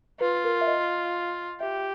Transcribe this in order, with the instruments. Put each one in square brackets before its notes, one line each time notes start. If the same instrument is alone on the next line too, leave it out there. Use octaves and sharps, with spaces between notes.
[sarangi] F4 [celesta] B4
[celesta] A#4
E5
D#5
[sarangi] G4 [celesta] E5